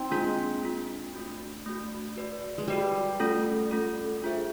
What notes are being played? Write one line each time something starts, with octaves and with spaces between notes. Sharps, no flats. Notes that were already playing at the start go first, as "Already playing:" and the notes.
Already playing: C4 D#4
G#3 A#3 D4 F4
A#3 D4 F4
A3 D4 F#4
A3 D4 F#4
F#4 B4 D5
G#3
G3 F#4 B4 D5
A3 C#4 F4 A4
A3 C#4 F4 A4
D4 F4 G#4 C5 E5